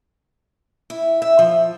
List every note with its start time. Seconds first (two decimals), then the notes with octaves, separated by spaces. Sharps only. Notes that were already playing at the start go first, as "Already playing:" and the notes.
0.90 E4
1.22 E5
1.39 F3